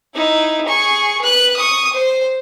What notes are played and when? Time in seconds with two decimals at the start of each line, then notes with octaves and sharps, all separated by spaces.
0.15 D#4 E4
0.66 G#4 C#6
1.21 B4 F#6
1.56 C#6 D#6
1.93 C5